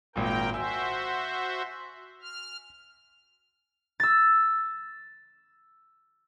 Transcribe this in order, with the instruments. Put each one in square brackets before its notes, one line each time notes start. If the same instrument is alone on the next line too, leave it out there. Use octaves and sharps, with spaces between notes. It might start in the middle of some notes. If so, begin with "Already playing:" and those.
[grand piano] G#1 A#2 [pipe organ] A#4 G5
[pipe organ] F#4 C5 E5 [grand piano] G#5 E6
[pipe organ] F6
[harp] E6 A6